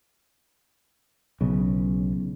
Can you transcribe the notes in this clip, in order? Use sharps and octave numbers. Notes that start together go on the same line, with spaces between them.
B1 C#3